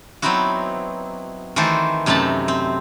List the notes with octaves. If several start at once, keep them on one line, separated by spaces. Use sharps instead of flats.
F#3 B3 C4 D#4 E4 F#4
D#3 E3 A3 F#4 A4 C5
F#2 C3 A3 D#4 A5 B5
C4